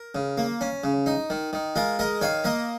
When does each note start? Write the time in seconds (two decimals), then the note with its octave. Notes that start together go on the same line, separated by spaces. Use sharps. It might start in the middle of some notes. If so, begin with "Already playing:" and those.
Already playing: A#4
0.15 C#3
0.38 A#3
0.61 C#4
0.84 C#3
1.06 D#4
1.30 D#3
1.53 D#3
1.76 G#3 F4 A#4
1.99 G#3 A#4 D#5
2.21 D#3 C#5 F5
2.44 A#3 A#4 D#5